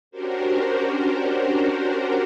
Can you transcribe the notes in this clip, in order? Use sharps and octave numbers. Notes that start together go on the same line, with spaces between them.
C#4 D4 F#4 G4 A#4 C5